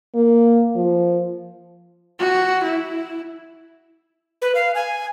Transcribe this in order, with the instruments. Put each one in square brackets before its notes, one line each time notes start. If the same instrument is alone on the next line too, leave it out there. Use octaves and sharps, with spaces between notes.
[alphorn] A#3
F3
[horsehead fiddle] F#4
E4
[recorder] B4
F5
G#5